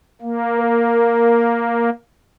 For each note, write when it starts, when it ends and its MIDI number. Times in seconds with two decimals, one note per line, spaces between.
0.22 1.90 58
0.60 1.78 70